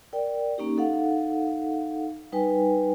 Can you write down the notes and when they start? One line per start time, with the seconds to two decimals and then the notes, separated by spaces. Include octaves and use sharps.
0.13 A#4 D5 G5
0.58 A#3 C#4 D#4 G4
0.77 D#4 A4 F5 F#5
2.32 G3 D#4 B4 G5 G#5